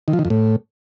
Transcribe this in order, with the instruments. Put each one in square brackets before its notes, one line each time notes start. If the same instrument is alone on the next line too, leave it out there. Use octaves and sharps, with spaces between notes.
[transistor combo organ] D#3
F3
D#3
F2
A2